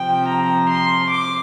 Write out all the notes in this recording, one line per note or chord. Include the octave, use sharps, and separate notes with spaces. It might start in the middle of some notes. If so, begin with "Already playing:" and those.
Already playing: C3 F3 G5
A#5
C6
D6